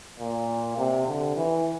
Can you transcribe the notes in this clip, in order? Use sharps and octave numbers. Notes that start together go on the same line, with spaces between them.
A#2
C3
D3
E3